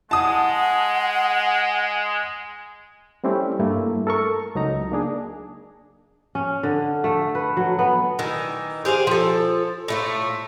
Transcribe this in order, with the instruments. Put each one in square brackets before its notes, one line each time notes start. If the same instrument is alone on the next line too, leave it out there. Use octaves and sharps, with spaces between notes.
[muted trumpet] G#3 [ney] F#5 [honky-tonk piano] A5 D#6
[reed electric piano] G3 A3 C4 C#4 E4 G4
G2 A3 A#3 E4
A4 A#4 C#6
C#2 F#3 D#4 A#5
A#3 D4 G#4
[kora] C#4
D3
A3
B4
F#3
B3
[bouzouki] D#3 E3
G4 G#4 C5 F5
F3 A4
A2 A3 F4